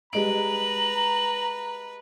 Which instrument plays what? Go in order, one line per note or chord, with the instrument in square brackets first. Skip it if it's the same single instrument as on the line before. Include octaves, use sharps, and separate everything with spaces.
[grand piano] G3 G#3 D7 [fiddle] B4 [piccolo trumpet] A#5 [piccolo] F#7